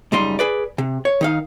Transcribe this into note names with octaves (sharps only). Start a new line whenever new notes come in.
C#2 F#2 G3 D#4 C6
G#4 B4 D5
C3
C#5
D#3 D#4 F5